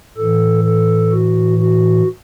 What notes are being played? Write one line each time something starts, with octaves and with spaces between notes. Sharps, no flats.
A2 E3 A4
A4
F#4
F#4